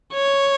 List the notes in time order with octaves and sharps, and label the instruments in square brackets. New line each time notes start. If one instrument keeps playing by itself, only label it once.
[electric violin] C#5